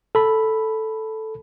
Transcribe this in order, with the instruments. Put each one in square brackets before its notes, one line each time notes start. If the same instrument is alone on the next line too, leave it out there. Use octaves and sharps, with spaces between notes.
[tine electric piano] A4 B5